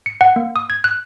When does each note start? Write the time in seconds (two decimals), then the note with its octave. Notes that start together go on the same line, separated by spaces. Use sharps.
0.06 C#7
0.21 F#5
0.36 A#3
0.56 D#6
0.70 G#6
0.84 F#6